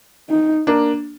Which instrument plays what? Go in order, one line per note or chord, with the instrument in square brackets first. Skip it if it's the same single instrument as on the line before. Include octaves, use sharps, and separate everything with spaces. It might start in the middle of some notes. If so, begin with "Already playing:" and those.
[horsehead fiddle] D#4
[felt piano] A#3 D4